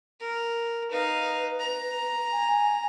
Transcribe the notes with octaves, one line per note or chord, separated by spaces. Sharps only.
A#4
D#4 B4 F5
A#5
G#5